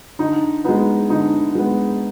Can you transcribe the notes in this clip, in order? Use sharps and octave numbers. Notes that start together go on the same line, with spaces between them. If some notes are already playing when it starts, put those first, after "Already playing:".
D3 D#4
G#3 B3 D#4
D3 D#4
G#3 B3